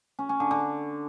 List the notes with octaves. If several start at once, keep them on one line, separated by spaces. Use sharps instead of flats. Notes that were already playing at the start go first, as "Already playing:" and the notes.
C#4
C#4
D3
D3